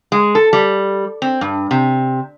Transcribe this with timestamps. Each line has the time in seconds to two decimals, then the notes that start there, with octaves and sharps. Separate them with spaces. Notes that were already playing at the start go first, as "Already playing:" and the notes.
0.12 G#3
0.35 A4
0.53 G3
1.22 C4
1.41 G2
1.71 C3